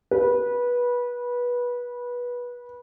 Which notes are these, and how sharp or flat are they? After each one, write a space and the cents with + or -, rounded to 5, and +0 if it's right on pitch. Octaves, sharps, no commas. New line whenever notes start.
B4 -20